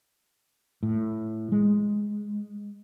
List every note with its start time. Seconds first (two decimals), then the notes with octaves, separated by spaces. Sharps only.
0.83 A2
1.52 G#3